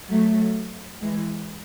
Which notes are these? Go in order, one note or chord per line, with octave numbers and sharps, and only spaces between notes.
F#3 A3
E3 G#3